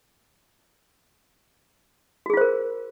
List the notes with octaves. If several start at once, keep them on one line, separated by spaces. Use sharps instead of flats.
F4 F#4 G#4 A#4 C5